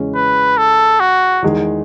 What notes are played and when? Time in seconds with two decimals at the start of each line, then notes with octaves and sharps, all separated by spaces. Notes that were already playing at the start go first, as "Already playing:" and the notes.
Already playing: E2 C#3 G#3 C#4
0.15 B4
0.57 A4
1.00 F#4
1.42 E2 D#3 G#3